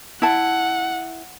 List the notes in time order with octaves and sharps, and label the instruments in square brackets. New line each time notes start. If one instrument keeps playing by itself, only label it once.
[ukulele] E4 A5 [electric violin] F#5